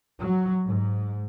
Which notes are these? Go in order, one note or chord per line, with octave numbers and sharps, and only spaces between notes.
F#3
G#2